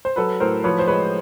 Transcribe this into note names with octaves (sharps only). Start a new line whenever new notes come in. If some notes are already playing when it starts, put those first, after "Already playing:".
C5
F#3 A4 B4
A2 A#4 C5
F3 B4 C#5
C5
G#3 B4 C#5